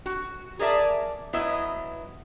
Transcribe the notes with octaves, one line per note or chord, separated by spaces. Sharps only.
F#4
G#4 A#4 D5 E5 A5
F#3 B3 E4 B4 D#5 E5